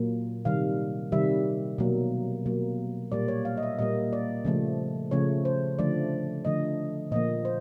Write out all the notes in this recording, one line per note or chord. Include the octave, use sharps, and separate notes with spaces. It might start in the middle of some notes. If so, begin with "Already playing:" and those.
Already playing: A#2 F#3 A#3
C3 D#3 G3 F5
C3 D#3 G3 E5
B2 F#3 A#3
B2 F#3 A#3
A#2 G3 A#3 D5
C#5
F5
D#5
E5
A#2 G3 A#3 D#5
D5
C#3 F3 A3
C#3 F3 A3 C#5
C5
D3 F3 A3 D5
D3 F3 A3 D#5
A#2 F3 A#3 D#5
C5